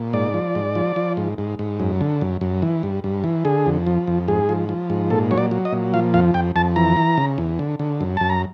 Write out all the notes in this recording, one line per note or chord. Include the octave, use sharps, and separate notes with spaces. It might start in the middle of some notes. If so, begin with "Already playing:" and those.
Already playing: A#2
G#2 D5
F3
G#2
F3
F3
G#2
G#2
G#2
F#2
D3
F#2
F#2
E3
G2
G2
E3
D3 G#4
F2
F3
F2
G#2 G#4
F3
F3
G#2
A#2 A4
F#3 C#5
D5
F#3
D#5
A#2
F3 F5
F2 F5
F2 G5
F2 A5
E3 A#5
E3
C#3
E2
D3
D3
F#2
F#2 A5
A#5